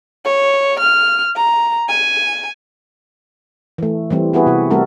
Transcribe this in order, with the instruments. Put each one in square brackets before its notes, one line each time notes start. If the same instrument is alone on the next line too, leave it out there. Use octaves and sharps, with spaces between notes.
[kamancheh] C#5
F6
A#5
G#5
[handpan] E3 A3
E3 G3 C4
B3 E4 F#4 G#4 B4
C3 F#4
G3 A3 C4 F#4 A4 A#4